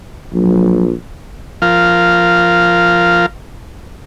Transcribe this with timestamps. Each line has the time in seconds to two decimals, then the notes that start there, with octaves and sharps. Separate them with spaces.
0.33 A#1 F#3
1.62 F3 F4 A#4 F5